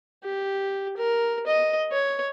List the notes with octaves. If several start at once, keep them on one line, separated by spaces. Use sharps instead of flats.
G4
A#4
D#5
C#5